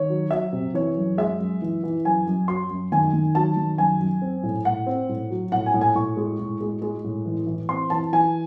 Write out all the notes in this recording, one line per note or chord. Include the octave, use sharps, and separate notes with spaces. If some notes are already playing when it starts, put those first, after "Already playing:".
Already playing: D#3 C#5
F#3
F#3 E5
C3
E3 C#5
F#2
G#3 E5
F#2
E3
E3
F#2 G#5
F#2
F#3 C6
F#2
D#3 G#5
D#3
F#3 A5
D#3
F#2 G#5
F#2
C4
A2
A2 F#5
C4
A2
F#3
A2 F#5
G#5
A2
G#5
A2 C#6
G#3
A2
G#3
G#3
A2
E3
E3
C4 C6
E3 A5
E3 G#5